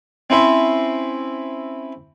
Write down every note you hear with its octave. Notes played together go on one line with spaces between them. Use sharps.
C4 C#4 E4 C5 E5